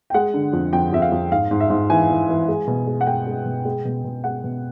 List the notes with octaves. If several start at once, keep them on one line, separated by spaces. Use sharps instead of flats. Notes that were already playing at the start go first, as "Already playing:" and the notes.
G5
G#3 F#5
D3
F2
F2 G5
F2 E5
F5
F2
G#2 F5
G#2
E5
G#2
E3 G#5
E3
E3
G#3
B2
G#3
F#5
G#3 G5
G#3
B2
G#3
B2
B2
G#3 F#5
B2